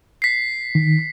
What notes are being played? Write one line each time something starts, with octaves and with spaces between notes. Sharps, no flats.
B6 C7
D#3